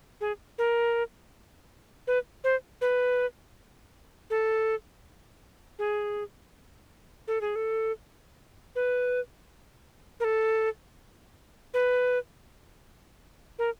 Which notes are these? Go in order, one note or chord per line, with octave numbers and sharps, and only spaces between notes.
G#4
A#4
B4
C5
B4
A4
G#4
A4
G#4
A4
B4
A#4
A4
B4
A#4